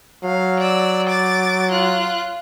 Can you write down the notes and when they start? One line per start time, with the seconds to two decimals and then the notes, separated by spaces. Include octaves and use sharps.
0.24 F#3 F5
0.59 D5 E6
1.09 D6 A6
1.71 F4 F#6